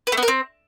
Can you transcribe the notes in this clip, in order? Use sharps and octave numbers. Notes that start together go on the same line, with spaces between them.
B4
A3
B3
A#4
C4